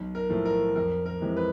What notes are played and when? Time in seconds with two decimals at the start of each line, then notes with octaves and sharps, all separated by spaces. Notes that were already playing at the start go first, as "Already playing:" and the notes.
Already playing: B1
0.15 A#4
0.29 A2 F3 A3
0.45 A#4
0.76 F2 A#4
1.06 A#4
1.21 C3 E3 G#3
1.37 B4